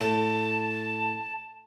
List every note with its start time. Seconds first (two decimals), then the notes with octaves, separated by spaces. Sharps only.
0.01 A2 A4 A5